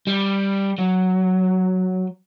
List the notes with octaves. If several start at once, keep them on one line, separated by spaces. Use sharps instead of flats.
G3
F#3